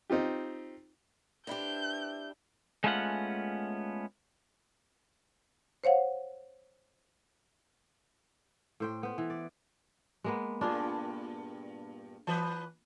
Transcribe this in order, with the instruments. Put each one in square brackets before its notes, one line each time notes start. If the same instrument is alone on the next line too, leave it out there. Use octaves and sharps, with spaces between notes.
[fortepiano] C4 D#4 F4 G4
[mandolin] C4 E4 B4 [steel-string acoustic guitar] D4 G4 [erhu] G6
[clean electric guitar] G#3 A3 B3 C#4 F4 F#5
[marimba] C5 C#5 F5 F#5
[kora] A2 C5 G5
B3 C5
E3
D5
G#3 A#3 B3
[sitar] G2 A#2 [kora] D4 F4 G#4
[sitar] E3 B4